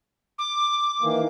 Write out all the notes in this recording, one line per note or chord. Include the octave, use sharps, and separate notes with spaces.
D6
D#3 E3 A#3